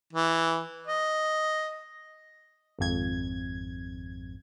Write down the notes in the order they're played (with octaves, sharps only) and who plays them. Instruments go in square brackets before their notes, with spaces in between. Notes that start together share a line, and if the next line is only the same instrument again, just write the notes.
[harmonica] E3
D#5
[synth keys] G#1 F2 G#6